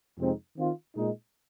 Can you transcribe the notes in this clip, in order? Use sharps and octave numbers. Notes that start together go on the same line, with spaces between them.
F2 C3 G#3 C4 D#4
D#3 C4 F4
A#2 G#3 D#4